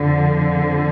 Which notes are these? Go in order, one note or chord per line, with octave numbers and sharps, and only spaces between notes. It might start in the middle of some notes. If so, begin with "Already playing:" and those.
Already playing: F2 D3 F3